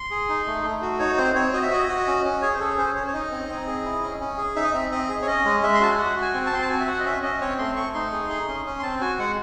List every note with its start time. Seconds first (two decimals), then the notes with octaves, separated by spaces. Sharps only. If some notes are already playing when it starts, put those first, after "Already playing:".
Already playing: C6
0.11 G#4
0.29 D#4
0.47 A3
0.65 A3
0.82 F#4
0.99 D#4 C#5
1.18 C4 C5
1.35 C4 C#5
1.53 F#4 D#5
1.63 E5
1.71 F#4 D#5
1.89 F#4
2.07 C#4
2.24 C#4
2.42 G#4 C#5
2.54 C5
2.60 G#4 A4
2.78 C#4 C5
2.96 C#4 C#5
3.07 C#5
3.13 D#4 D#5
3.31 C4
3.49 C4
3.67 G#4
3.85 E4
4.03 C#4
4.20 C#4
4.38 G#4
4.56 D#4 E5
4.64 D#5
4.72 C4 E5
4.92 C4 D#5
5.09 G#4
5.22 C#5
5.27 C#4 D#5
5.45 G#3
5.63 G#3 E5
5.75 C6
5.81 F#4 A5
5.91 G#5
5.98 F#4 F#5
6.16 F#4
6.22 G#5
6.34 C4
6.46 A5
6.52 C4 C6
6.62 A5
6.70 F#4 G#5
6.80 E5
6.87 F#4 F#5
7.00 D#5
7.05 C#4 E5
7.23 C#4 D#5
7.41 C4 C#5
7.59 A3 C6
7.76 A3 C#6
7.94 D#4 C6
8.12 G#4
8.30 G#4
8.48 C#4
8.66 C#4
8.79 C6
8.83 C4 A5
9.01 F#4 G#5
9.19 G#3 F#5